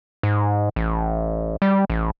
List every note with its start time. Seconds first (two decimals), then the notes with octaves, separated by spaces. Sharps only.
0.23 G#2
0.76 A1
1.62 G3
1.90 A1